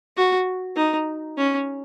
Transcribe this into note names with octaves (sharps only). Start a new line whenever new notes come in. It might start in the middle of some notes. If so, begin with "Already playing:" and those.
F#4
D#4
C#4